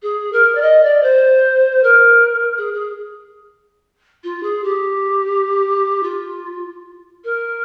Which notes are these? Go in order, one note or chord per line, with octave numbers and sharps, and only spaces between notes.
G#4
A#4
D5
D#5
D5
C5
A#4
G#4
G#4
F4
G#4
G4
F4
A#4